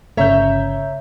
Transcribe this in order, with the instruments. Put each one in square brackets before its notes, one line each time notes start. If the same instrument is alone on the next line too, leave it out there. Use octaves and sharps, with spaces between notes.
[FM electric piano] G1 C#3 G6 [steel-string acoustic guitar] C#5 E5 A#5